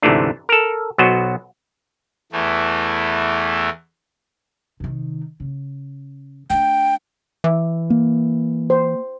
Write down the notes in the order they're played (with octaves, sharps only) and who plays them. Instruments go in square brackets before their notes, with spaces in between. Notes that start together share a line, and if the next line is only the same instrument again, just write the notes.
[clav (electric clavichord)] D2 G#2 C3 E3 A3 D4
A4 A#4
B1 B2 F#3 B3 F#4 C5
[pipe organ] E2 E3 A3
[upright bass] C3 D#3
C#3
[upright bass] A3 D4 [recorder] G5
[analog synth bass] E3 [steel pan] E5 D6
[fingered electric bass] A#3
[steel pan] C5